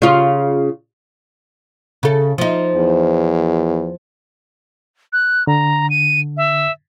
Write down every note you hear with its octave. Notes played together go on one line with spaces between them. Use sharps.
C#3 F4
C#3 A4
F3 D#4
E2
F#6
D3 A#5
D#7
E5